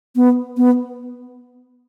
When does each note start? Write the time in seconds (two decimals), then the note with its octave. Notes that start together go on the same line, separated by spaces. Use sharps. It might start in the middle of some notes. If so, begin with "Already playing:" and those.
0.16 B3
0.57 B3